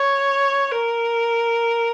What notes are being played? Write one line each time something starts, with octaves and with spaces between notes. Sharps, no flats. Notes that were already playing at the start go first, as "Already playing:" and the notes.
Already playing: C#5
A#4